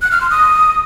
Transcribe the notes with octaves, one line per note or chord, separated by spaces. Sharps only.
F#6
F6
C6
D#6